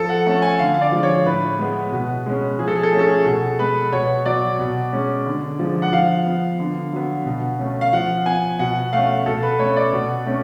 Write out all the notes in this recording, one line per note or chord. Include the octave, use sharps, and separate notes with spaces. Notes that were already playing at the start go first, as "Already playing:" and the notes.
Already playing: F3 A4
F#5
A3 C#4 A5
G#5
D3 F5
F5
D5
F3 G#3
C#5
A2 B4
G#3 B3
B2
G#3 C#4
F3 G#4
A4
G#4
A4
A3 C#4 G#4
A4
G#4
B2 A4
G#3 B3 B4
B2 C#5
F#3 B3 D5
B2
G#3 C#4
D3
F3 G#3
F#5
F3 F5
B3
D3
F#3 B3
B2
A3 C#4
F5
F3 F#5
B3 G#5
B2 F#5
A3 C#4 F5
B2 A4
B4
A3 C#4 C#5
D5
B2
A3 C#4